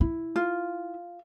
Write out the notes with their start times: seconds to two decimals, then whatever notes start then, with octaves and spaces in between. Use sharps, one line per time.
0.01 E4
0.36 F4